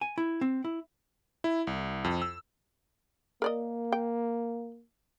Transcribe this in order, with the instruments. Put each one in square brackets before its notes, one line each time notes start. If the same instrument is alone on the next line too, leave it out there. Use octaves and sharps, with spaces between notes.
[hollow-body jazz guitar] G#5
E4
C4
E4
[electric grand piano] E4
C2
F2
E6
[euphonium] A#3 [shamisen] A#4 D5 D#5
[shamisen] G5